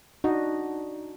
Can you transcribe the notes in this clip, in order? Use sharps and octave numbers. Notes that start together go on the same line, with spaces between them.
D4 D#4 F#4 D#5